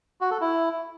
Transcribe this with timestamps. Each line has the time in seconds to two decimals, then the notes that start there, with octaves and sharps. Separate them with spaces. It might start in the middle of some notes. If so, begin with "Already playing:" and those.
0.21 F#4
0.31 A4
0.41 E4